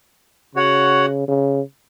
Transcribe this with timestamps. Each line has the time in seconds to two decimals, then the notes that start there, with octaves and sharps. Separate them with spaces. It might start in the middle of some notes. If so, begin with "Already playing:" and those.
0.55 C#3 F#4 C#5 F#5
1.28 C#3